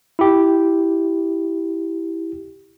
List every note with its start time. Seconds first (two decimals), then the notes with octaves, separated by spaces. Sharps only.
0.19 E4 G4